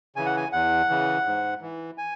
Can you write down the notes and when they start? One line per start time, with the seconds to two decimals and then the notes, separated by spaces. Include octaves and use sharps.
0.16 C#3 E3 G#5
0.26 F#5
0.37 G#5
0.52 E2 F#5
0.89 C#3 E3
1.26 G#2
1.62 E3
1.98 G#5